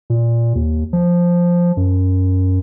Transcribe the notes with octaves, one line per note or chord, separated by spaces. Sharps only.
A#2
D#2
F3
F#2